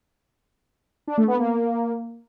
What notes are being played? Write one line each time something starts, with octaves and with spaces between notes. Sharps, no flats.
D4
A3
B3
A#3